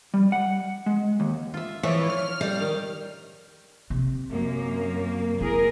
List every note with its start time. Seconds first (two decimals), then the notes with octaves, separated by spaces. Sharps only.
0.14 G3
0.32 F#5
0.86 G#3
1.20 D#2
1.54 F4 E5
1.83 E3 F3 C#5 D5
2.10 F6
2.41 G3
2.60 D#3
3.90 C3
4.31 F#2 A#3
5.41 E4 G#4 A#4